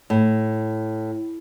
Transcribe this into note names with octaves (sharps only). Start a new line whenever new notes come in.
A2